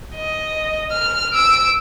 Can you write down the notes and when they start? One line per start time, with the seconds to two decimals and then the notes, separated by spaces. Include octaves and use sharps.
0.16 D#5
0.92 F6
1.33 E6 D7